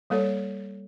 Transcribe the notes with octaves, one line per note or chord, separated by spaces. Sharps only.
G3 A#3 A4 C#5